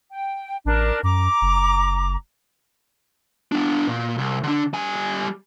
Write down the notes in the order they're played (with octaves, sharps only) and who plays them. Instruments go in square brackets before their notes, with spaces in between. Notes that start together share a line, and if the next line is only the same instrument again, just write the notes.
[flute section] G5
[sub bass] A1 [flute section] D4 A#4
[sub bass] F#2 [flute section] A#5 D6
[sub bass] F#1
[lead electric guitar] B3 D4
A#2
C2
D3 D4
G3 G#5